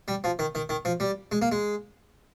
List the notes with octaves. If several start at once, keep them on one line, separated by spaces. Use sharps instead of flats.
G3
F3
D#3
D#3
D#3
F3
G3
G#3
A#3
G#3